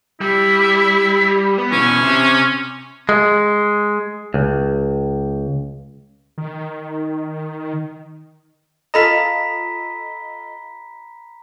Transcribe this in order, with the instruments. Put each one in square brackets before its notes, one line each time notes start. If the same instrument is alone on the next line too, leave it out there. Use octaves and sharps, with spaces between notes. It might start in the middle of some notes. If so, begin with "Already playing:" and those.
[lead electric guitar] G3 [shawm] E4
[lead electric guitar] B3
[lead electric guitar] B2 E3 [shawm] C#4
[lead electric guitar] C3
[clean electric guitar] G#3
C#2
[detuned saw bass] D#3
[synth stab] F4 A4 D#5 [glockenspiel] A#5 B5 B6